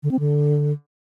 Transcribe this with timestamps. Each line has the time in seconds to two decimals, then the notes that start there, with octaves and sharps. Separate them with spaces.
0.03 D3
0.11 C4
0.19 D3